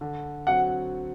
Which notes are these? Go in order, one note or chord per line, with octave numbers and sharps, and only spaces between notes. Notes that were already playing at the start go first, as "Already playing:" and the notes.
D3
F#3 C4 F#4 F#5